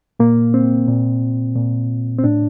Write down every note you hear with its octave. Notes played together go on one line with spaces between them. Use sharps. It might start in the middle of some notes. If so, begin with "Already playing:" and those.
A#2 A#3
C4
A#2
A#2
C4
A2 D4